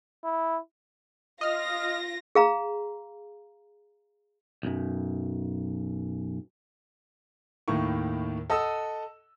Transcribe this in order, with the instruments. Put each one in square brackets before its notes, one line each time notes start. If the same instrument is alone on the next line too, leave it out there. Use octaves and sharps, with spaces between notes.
[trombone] E4
[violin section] F4 A#6 [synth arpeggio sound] D#5 F6
[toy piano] G#4 F5 A#5
[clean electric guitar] B1 F#2
[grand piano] D#2 A2 D#3 E4 C#6
A4 D#5 F#5 D#6 E6